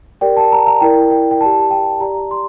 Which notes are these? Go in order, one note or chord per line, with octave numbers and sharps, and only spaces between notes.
G4 A#4 D5 G5
A5
A#5
A#5
E4 A#4 D5 G5
G5
G5
G4 D5 A5
G5
G4 D5 A#5
C6